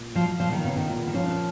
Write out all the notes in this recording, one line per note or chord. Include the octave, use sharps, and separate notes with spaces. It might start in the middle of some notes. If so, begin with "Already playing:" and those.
Already playing: A#2
F3 F#3
A#2 F3
D#3
C#3 B3
D#3
A#2
D#3
F3 C#4